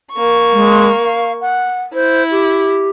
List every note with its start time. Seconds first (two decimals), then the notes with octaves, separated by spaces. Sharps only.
0.13 A#3 C#6
0.52 G#3
1.02 F5
1.41 F#5
1.94 E4 C5
2.31 G4